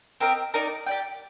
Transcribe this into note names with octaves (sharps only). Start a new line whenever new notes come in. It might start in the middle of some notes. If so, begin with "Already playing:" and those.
C4 G4 A#4 D#5
D#4 A#4 D5
G4 D5 G5